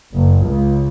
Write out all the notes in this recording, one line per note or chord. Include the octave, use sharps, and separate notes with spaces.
F#1
C#2